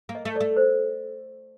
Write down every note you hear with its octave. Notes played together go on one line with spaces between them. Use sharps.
A#3
D#5
A3
A3 D5
C5